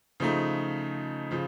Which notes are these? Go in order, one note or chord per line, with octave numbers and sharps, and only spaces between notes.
C#3 F3 A3 D#4
C#3 F3